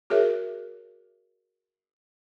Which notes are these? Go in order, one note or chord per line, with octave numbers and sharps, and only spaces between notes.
F#4 G#4 A#4 C#5 E5